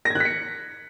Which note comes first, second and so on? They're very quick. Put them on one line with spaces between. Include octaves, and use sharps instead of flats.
A#6 G#6 F#6 B6 C#7